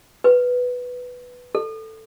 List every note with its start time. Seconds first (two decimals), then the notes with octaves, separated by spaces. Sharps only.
0.24 B4
1.55 A4